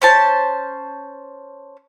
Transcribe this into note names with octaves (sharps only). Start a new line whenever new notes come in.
C#4 C5 A5